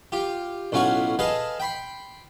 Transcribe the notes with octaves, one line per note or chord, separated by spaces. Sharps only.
F4 G4
B1 A2 C#4 F4 F#4 C#6
G#4 A4 B4 D#5 F5
G5 B5 C6